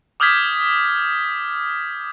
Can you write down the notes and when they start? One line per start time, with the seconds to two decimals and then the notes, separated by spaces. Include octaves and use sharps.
0.20 D6 D#6 F6 G6 G#6 B6